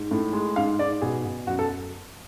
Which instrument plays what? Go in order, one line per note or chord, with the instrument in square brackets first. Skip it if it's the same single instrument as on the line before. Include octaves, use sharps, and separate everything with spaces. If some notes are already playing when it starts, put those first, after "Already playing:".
Already playing: [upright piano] G#2
A2
G#3
G#2 F5
G#2 D5
B2 G#4
B2
F#2 F#4
A4